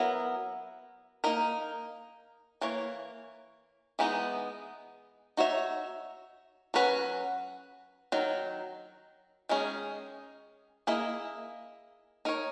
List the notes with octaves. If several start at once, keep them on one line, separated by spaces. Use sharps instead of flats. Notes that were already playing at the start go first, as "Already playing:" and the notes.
Already playing: F#3 B3 E4 A#4
A#3 D#4 A#4
E3 A#3 C#5
E3 G#3 B3 D#4
D#4 F#4 C#5 E5
F#3 C#4 F#4 B4
D#3 F#3
D#3 G#3 C#4 G#4
A#3 E4 G#4 D#5
D#4 A#4 C#5